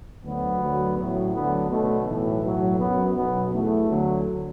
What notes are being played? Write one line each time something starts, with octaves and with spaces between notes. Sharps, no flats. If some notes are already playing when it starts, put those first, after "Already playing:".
D2 D3 F#3 B3
D2 D3 F#3
A1 A2 F#3
D2 D3 F#3 B3
B1 B2 F#3 A3
B1 A2 E3
B1 A2 F#3
F#2 F#3 B3
B1 B2 F#3 B3
E2 E3 A3
D2 D3 F#3